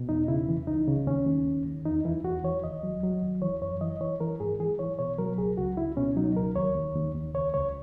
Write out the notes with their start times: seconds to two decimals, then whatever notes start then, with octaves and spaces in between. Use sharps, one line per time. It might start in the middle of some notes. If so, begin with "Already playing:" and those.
Already playing: B2
0.09 E2 D#4
0.28 C#3 E4
0.49 E3
0.67 C#2 D#4
0.88 C#3
1.07 D#2 C#4
1.26 D#2
1.46 D#2
1.66 D#2
1.85 E2 D#4
2.05 E3 E4
2.25 E2 F#4
2.44 E3 C#5
2.64 D#2 D#5
2.83 F#3
3.03 F#3
3.22 D#2
3.42 E3 C#5
3.62 F#2 C#5
3.81 E3 D#5
4.01 E3 C#5
4.20 E3 A#4
4.40 G#2 G#4
4.59 E3 G#4
4.79 E3 C#5
4.99 B2 C#5
5.18 F#3 A#4
5.38 C#2 G#4
5.58 C#2 F#4
5.77 C#2 E4
5.97 B2 C#4
6.16 F#3 D#4
6.36 C#2 A#4
6.56 D#2 C#5
6.75 D#2
6.95 D#2
7.15 D#2
7.34 C#2 C#5
7.54 C#2 C#5